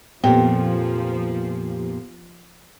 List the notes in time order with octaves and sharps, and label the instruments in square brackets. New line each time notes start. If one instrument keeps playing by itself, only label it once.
[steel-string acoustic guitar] F2 A#2 [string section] F3 [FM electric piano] B3 G4 [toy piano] G5